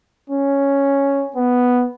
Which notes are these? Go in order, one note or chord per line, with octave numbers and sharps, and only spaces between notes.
C#4
B3